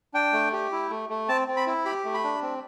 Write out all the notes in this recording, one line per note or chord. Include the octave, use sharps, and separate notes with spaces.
D4 G5
A3
G4
E4
A3
A3
C4 A5
C4
B5
E4
G4 B5
A3
B5
D4
C4